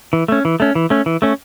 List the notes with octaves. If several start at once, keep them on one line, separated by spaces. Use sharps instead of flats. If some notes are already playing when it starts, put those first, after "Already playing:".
E3
A3 C#4
E3
A3 C#4
E3
A3 C#4
E3
A3 C#4